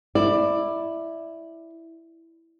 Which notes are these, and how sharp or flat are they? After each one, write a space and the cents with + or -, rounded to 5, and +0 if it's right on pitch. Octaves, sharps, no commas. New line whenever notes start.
E4 +0 D5 +15